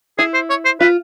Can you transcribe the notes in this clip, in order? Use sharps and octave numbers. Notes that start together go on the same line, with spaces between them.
E4 G#4
C5
C#5
C5
F4 B4